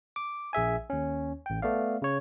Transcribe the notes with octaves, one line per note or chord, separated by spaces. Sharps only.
D6
A#1 G#4 E5 G#5
D#2 C#4
A1 G5
A3 B3 D5 F5
C#3 C#5